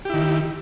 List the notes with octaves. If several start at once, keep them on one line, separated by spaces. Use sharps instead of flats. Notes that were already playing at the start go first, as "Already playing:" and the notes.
D#3 E4 G4